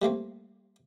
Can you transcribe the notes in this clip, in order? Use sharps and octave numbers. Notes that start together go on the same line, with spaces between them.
G3 A3 A#3 C4